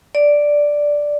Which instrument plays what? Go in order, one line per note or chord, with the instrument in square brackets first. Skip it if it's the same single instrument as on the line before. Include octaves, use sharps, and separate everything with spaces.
[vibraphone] D5